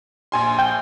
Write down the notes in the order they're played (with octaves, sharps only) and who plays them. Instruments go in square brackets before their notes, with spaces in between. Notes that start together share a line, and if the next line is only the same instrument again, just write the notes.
[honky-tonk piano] A#1 G#5 C6
[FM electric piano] G5